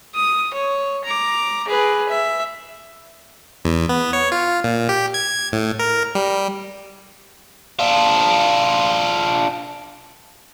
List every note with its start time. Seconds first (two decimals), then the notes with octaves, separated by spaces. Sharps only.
0.15 D#6
0.54 C#5
1.05 A#5 D6
1.68 G#4 B4
2.09 E5
3.65 E2
3.89 B3
4.13 C#5
4.32 F4
4.64 A#2
4.89 G4
5.14 G#6
5.52 A2
5.79 A#4
6.15 G3
7.79 D4 F4